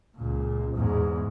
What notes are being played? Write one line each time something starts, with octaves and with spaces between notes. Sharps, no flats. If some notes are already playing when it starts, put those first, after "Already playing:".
C#2 A#2
E2 G#2